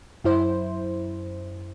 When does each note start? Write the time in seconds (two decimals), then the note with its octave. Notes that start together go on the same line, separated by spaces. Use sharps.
0.24 F#2 E4 C5